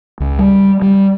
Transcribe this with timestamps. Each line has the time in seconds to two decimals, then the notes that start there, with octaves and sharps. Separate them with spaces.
0.20 C#2
0.39 G3
0.82 G3